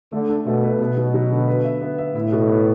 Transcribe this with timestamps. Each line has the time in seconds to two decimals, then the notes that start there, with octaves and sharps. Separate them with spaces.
0.12 D3 A3
0.29 D4
0.46 B2 A3
0.63 B4
0.80 B2 B3
0.97 F#3
1.14 F#3
1.31 D3
1.47 B4
1.65 E5
1.81 B3
1.98 E5
2.14 A2 E4
2.32 B2
2.49 B3